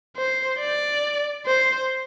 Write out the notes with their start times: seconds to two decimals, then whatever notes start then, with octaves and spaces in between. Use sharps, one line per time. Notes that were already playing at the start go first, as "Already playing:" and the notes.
0.16 C5
0.60 D5
1.46 C5